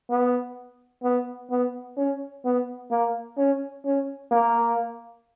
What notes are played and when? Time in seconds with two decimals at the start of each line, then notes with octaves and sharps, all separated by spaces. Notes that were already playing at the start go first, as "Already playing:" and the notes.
0.10 B3
1.03 B3
1.50 B3
1.97 C#4
2.45 B3
2.91 A#3
3.38 C#4
3.85 C#4
4.31 A#3